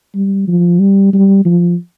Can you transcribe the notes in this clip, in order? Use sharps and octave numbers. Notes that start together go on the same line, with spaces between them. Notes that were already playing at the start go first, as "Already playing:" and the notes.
G3
F3
G3
G3
F3